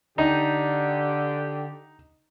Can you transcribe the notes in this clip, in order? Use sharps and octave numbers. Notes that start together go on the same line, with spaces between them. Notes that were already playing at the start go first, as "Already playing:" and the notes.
D3 D#4 G4